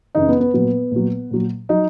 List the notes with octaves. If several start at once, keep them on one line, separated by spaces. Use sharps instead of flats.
F#2 C#3 E3 D#4
B3
B3
A#2 F#3 B3
A#2 F#3
A#2 F#3
F#3 D#4